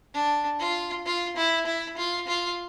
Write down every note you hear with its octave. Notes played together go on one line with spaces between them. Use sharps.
D4
F4
F4
E4
E4
F4
F4